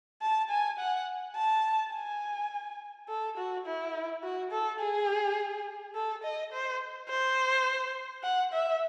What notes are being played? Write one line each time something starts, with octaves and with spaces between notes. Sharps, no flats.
A5
G#5
F#5
A5
G#5
A4
F#4
E4
F#4
A4
G#4
A4
D#5
C5
C5
F#5
E5